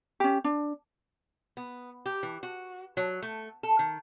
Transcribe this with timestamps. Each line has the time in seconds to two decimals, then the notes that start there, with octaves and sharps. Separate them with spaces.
0.20 C#4 G4
0.44 D4
1.57 B3
2.06 G4
2.23 E3
2.43 F#4
2.97 F#3
3.22 A3
3.63 A4
3.79 D#3